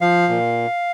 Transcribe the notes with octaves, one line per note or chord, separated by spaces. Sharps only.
F3 F5
A#2